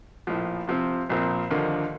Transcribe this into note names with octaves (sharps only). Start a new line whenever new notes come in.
A#1 A2 F3
C3 F3 C4
A#1 A#2 F3 C4
D#2 D3 F3 A#3